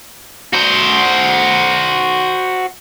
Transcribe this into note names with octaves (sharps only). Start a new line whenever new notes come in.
F#4 C5